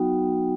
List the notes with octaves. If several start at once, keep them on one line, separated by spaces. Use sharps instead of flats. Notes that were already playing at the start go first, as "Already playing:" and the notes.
Already playing: F#3 B3 D#4 F#4 G5